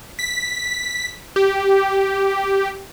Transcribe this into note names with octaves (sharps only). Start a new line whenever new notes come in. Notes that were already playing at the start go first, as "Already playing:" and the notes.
B6
G4